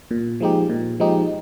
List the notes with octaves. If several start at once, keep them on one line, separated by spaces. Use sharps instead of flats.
A#2
F3 G#3 D#4 G4
A#2
F3 G#3 D#4 G4